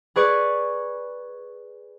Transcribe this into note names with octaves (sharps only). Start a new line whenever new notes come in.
G#4 B4 D5 C#6